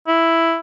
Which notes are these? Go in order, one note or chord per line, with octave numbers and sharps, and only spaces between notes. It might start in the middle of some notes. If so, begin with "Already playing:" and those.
E4